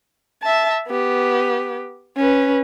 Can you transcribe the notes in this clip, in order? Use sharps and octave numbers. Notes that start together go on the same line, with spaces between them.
E5 A5
B3 G4
C#4 B4